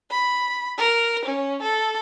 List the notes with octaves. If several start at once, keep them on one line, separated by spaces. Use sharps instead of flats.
B5
A#4
C#4
A4